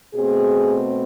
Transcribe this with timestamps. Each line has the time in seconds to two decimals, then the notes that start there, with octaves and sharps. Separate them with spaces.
0.14 B2 A3 C4 G#4